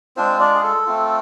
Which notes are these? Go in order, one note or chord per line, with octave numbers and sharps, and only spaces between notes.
G#3 C4 D4 F4 C5
D4 D5
G#4
A4
A3 C4 F4